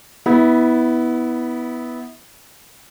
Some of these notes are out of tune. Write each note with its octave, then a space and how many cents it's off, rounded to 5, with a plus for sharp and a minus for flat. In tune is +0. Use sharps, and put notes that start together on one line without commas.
B3 +0 E4 -25